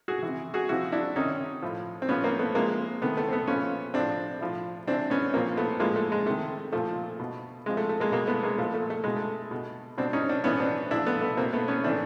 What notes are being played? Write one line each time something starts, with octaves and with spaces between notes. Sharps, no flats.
F#4 G#4
E3
C3
F#4 G#4
C3 F3 E4 F#4
D4 E4
C3 D#3 C#4 D#4
A2 F3
C4
A2 F3 B3 C#4
A#3 C4
A3 B3
C3 F3 G#3 A#3
C3 D#3 A3 B3
A3 B3
C4
A3 B3
A#2 F3 B3 C#4
A2 F3 C4 D4
A2 F3
C3 E3 C4 D4
B3 C#4
A#2 F3 A#3 C4
A3 B3
A2 F3 G#3 A#3
A3
G#3
C3 D#3 A3
A#2 F3 A3
B2
C3 F3 G#3
A3
A3
G#3 A#3
B2 G#3 A#3
A3 B3
G#3 A#3
A#2 F3 A3
A3
A3
B2 G#3
A3
B2
B2 C4 D4
C#4 D#4
C4 D4
A2 E3 B3 C#4
C4 D4
A#2 F3 D4 E4
A3 B3
A3 B3
B2 A#3 C4
A3 B3
B3 C#4
A2 E3 C4 D4